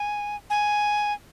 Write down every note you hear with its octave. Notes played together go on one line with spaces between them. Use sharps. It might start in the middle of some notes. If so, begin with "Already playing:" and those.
Already playing: G#5
G#5